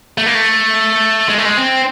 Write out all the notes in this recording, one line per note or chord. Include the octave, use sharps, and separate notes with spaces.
A3
A#3
A3
G#3
A3
G#3
C4